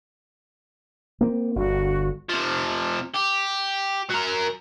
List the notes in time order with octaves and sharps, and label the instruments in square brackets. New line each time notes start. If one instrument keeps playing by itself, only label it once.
[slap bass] A#3 C4
[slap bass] G1 D3 [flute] F#4
[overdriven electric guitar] C3 F3
G4
F#3 A#4